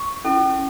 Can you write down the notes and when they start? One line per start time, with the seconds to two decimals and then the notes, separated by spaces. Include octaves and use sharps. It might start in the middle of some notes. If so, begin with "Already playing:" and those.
Already playing: C#6
0.24 C#4 E4 A4